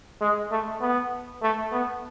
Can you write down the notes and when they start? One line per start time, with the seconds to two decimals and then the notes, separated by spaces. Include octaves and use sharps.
0.21 G#3
0.51 A3
0.81 B3
1.42 A3
1.72 B3